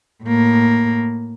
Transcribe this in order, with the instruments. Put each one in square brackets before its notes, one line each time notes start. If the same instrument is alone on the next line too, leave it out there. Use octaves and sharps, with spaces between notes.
[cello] A2 A#3